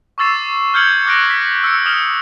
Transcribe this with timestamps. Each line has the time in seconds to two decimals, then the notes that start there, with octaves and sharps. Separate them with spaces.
0.18 C#6 D6 E6 A6 C7 E7
0.74 F6 G6 G#6 C#7 F#7
1.06 D6 F#6 A#6 D7
1.30 B6
1.64 E6 C#7
1.86 D#6 F6 E7